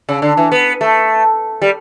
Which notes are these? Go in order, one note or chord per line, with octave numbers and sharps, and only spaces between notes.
C#3
D3
E3
B3
A3
G3